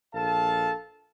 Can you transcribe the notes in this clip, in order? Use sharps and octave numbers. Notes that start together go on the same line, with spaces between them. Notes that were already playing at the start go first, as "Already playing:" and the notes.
A#1 A4 F5 A5